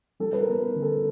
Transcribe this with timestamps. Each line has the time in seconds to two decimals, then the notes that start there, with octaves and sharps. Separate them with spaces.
0.20 G3 A4
0.33 B4
0.41 A#4
0.48 B3
0.62 A#4
0.75 D3
0.82 A4